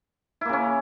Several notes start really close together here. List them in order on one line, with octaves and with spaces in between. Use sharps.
E4 A#3 C#3 C#4